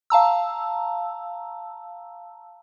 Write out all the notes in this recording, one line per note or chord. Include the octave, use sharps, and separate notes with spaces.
F5 A5 A#5 E6